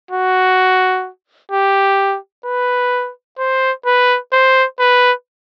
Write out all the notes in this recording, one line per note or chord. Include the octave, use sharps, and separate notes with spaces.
F#4
G4
B4
C5
B4
C5
B4